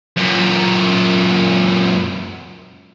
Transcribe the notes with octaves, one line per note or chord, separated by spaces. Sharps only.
F#2 A#2